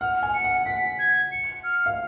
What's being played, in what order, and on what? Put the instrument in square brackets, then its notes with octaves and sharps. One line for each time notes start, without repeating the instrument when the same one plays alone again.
[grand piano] F#5 [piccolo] F6
[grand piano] G#5
[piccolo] C#7
[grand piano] F#5
[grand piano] F#5 [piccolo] B6
[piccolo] G#6
C#7
F6
[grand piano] F5